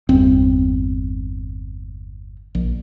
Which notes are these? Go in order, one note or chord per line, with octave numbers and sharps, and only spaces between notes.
G1 E2 C4
A#1